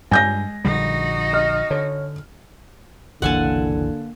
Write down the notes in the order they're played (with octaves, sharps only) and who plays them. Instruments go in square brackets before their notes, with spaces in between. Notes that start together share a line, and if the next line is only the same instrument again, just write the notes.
[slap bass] G2 G3 [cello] G#3 [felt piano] G#5 G6 A#6
[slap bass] A#1 D3 G3 [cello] D#4 F#4
[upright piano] D#5 F6
[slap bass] D3 [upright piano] C#5
[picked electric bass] F#1 C2 E3 [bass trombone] D3 [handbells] A#3 [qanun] F#5 G#5 A5